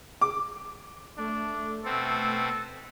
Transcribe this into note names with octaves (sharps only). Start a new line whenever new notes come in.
D6
A3 D4
B2 C4 A4